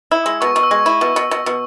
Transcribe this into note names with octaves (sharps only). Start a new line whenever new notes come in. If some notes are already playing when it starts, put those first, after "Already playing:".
E4 E6
G#3 E6
B2 C#6
B2 C#6
E6
G#3 C#6
E4
B2
B2
B2
B2